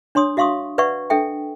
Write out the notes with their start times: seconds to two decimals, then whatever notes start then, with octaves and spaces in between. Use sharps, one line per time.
0.15 D4 C#5 C6 D#6
0.37 F#4 E5 F5 C6 C#6 D#6
0.78 B4 D5 E5 F#5 C#6
1.10 D4 A4 E5 G5